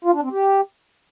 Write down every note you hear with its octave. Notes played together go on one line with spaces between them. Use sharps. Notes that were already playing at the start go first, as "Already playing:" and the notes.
F4
D4
C4
G4